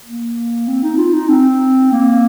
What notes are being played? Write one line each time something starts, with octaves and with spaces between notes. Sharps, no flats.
A#3
C4
D#4
F4
D#4
C4
A#3